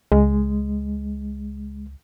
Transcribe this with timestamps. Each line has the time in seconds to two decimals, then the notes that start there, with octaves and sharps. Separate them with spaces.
0.12 C#2 G#3